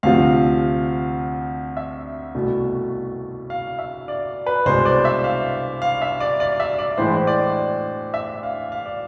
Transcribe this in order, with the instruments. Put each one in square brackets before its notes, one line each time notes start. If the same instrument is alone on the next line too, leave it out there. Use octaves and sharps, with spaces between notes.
[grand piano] D2 C3 F3 F5
E5
C2 B2 A3
F5
E5
D5
B4
C2 B2 G#3 C5
D5
E5
F5
F5
E5
D5
D5
E5
D5
A2 E3 G#3 C5
C5
D5
E5
F5
F5
D5